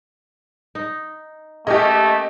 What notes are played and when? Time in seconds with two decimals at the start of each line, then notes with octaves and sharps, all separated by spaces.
0.75 D#4
1.67 A3 A#3 C#4 G4 G#4 D#5